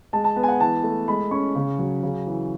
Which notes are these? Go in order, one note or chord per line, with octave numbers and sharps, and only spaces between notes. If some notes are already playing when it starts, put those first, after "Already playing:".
G#3 A5
A5
B3
G#5
F#5
E3 A5
A3
G#3 B5
C#4 C#6
C#3
F#3
C#3
E3